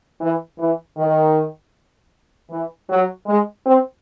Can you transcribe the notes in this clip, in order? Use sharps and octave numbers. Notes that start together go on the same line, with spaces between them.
E3
E3
D#3
E3
F#3
G#3
C4